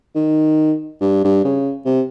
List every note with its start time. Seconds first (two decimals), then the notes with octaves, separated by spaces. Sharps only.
0.15 D#3
1.01 G2
1.24 G2
1.45 C#3
1.85 C3